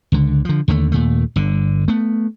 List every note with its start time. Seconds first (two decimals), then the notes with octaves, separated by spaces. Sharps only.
0.12 C#2 D3
0.45 D3 F3
0.68 D#2 D3 F3 A3
0.92 D#2 A#2 A3
1.36 G1 D3
1.88 A3 B3